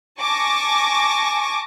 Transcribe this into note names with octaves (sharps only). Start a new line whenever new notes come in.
G#5 A5 C#6 D6 A#6